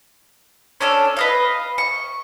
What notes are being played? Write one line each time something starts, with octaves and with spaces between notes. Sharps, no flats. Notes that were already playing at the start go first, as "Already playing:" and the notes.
C#4 D4 A4 F6
B4 D#5 F5
C#6